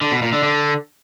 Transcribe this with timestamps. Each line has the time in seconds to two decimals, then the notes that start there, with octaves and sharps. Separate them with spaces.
0.01 D3
0.12 B2
0.22 A#2
0.33 D3
0.43 D3